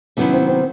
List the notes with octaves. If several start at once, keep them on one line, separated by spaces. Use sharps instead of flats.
C3 D#3 F#3 B3 C#4 E4
C4
C4